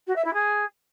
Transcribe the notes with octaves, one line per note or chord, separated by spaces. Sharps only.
F#4
E5
E4
G#4